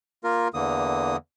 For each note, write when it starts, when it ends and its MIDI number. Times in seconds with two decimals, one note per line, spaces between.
0.24 0.48 58
0.24 0.48 65
0.24 0.48 70
0.54 1.17 40
0.54 1.17 50
0.54 1.17 52
0.54 1.17 58
0.54 1.17 87